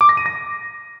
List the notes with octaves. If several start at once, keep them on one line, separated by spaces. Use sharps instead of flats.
D6
A#6
D#7
A#6